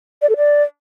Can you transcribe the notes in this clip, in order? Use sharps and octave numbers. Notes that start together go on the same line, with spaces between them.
D5
A4
D5